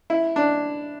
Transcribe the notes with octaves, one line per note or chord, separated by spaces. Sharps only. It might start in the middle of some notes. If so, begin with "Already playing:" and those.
E4
D4